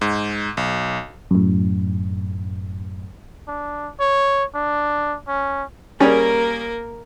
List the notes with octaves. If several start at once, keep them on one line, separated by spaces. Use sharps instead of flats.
G#2
B1
F#2 A2
D4
C#5
D4
C#4
G3 A#3 C#4 G#4 A#4